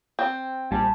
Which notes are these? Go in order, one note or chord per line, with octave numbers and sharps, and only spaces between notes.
C4
A#1 G3 G#5 A5